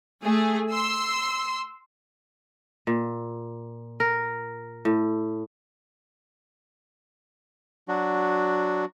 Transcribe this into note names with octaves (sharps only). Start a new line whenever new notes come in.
A3 G#4
C6 E6
A#2
A#4
A2
F#3 D4 F#4